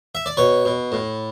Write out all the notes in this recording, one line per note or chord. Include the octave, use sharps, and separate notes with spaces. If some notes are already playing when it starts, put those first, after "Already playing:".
E5
D5
B2 C#5
B2
A2